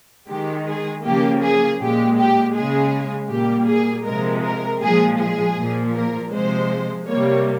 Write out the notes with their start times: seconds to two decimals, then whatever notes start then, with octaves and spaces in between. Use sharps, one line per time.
0.28 D#3 G#3 G4
0.66 G#4
1.04 C#3 F3 A#3 G4
1.41 G#4
1.80 A#2 G#3 G4
2.18 G4
2.54 C#3 G#3 G#4
3.30 A#2 G3 A#3 G4
3.68 G#4
4.05 C3 F3 G#3 A#4
4.43 A#4
4.81 A#2 F3 G#3 G#4
5.19 G#4
5.56 A#2 F3 A#3
5.95 A#4
6.31 C3 F3 G#3 C5
7.07 C3 G3 A#3 C#5